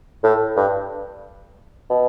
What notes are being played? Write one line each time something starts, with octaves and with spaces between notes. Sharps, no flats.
A2
G2
B2